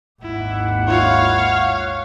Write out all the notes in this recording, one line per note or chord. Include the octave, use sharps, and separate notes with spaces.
G#1 D#2 E4 F#5
E4 F4 C#5 F5